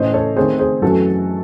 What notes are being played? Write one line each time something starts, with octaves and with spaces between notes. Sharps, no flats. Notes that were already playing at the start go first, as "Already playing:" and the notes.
Already playing: A2 E3 A3 C#4 C5 D#5
A4 C#5
D#3 A3 C4 G#4 C5
G#4 C5
F#2 E3 A3 F#4 A4